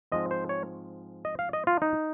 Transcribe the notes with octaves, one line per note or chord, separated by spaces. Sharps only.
G#2 F3 G#3 C4 D#5
C5
C#5
D#5
F5
D#5
F4
D#4